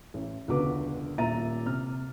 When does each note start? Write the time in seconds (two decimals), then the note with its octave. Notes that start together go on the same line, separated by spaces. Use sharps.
0.14 A1
0.48 E1 C#2 D3 F#4 B4 D6
1.18 D#1 A#2 E5 A#5 A6 D#7
1.66 C3 F6